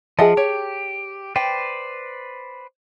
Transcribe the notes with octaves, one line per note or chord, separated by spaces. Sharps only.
F3 G#4 D#5 E5 F#5 A5
G4 C#5
B4 C5 D5 G5